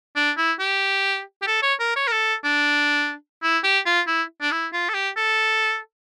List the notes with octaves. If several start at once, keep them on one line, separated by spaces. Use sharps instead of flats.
D4
E4
G4
G4
A4
C#5
A#4
C#5
A#4
A4
D4
E4
G4
F4
E4
D4
E4
F4
A4
G4
A4